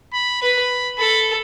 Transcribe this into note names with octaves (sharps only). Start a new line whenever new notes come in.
B5
B4 B5
A4 B5